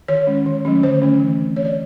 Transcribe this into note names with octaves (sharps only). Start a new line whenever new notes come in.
D#3 C#5
G#3 C#4
D#3
F#3 A3 C#4
D3 C5
F#3 A3 C#4
E3
A3 C4
E3 C#5
D5